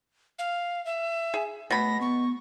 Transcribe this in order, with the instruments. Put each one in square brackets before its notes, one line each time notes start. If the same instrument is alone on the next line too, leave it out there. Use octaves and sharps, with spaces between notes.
[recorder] F5
E5
[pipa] G#4
[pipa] B2 B5 [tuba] A3 [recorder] A#6
[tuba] B3 [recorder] C#6